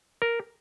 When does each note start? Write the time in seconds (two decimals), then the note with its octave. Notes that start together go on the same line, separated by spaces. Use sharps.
0.22 A#4